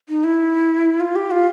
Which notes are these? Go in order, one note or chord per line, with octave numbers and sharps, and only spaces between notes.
D#4
E4
F4
G4
F4